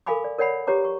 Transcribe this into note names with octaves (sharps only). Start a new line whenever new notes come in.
A4 A#4 F5 G#5 B5 D6
D5
A#4 C#5 D5 F#5 B5
G4 B4 C#5 A#5 D6
C#6